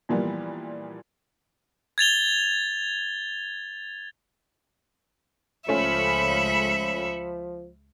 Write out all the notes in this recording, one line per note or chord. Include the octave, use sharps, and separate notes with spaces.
A#2 E3 F3 G3 A#3 B3
G#6 A6 F7 G7
C#2 F3 A3 C#4 F4 E5 B5 C#7